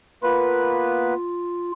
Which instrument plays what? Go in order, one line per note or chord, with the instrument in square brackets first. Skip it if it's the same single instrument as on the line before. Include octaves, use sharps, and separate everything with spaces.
[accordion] A#3 B3 B4 [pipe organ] F4